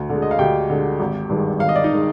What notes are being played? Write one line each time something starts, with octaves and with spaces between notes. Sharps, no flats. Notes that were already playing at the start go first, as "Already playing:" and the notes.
Already playing: D2
D3 G#3
D#5
F5
D2 G4 G5
D3 G#3
G#1
G2 D#3 G#3
G#1 F5
D#5
D5
D#4 D#5
D#3 G#3